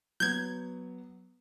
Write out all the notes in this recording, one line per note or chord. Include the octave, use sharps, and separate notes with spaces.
F#3 B3 G6 G#6